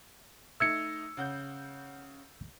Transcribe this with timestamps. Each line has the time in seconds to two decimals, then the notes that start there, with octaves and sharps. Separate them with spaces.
0.60 A3 D#4 E6 G#6 C#7
1.17 C#3 F#5 G6